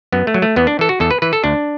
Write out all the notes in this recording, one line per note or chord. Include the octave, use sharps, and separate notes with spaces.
F#2 B3
A3
F#3
A3
E2 B3
D4
E3 A4
F#4
E2 A4
B4
E3 B4
A4
D2 D4